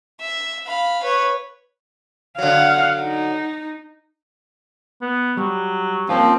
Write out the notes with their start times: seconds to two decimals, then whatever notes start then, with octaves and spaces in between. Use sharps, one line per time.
0.21 E5
0.67 F5 B5
1.03 B4 C#5
2.38 D3 F#3 F5 F#5
3.02 D#4
5.01 B3
5.37 F#3 G3
6.09 F3 A#3 C4 C#4 F4